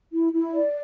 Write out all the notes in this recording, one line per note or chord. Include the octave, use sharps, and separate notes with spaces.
E4
E4
D5